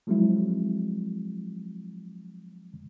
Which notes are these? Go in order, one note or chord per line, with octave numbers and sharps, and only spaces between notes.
F3 F#3 G#3 C4 E4